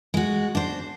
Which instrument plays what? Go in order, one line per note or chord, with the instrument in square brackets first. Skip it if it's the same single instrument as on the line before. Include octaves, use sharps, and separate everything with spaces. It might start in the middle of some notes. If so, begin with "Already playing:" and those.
[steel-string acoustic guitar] G#3 F#4
D4 C5